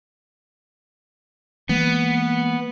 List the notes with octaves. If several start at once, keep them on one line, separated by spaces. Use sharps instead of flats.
E3 G#3 A#3 B3